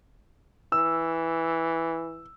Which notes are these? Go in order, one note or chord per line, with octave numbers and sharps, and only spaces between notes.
E3 E6